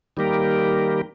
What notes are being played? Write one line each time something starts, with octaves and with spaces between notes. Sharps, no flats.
D#3 G3 A#3 G4 A#4